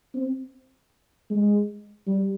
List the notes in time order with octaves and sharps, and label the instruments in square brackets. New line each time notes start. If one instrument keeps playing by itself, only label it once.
[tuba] C4
G#3
G3